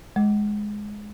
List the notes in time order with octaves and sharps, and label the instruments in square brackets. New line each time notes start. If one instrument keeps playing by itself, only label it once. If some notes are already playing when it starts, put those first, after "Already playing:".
[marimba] G#3